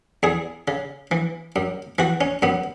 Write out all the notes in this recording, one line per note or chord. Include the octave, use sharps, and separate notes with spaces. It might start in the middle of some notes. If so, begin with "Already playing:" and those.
E2 G#4
C#3
E3
F#2
E3 F#4
C#4
F#2 B3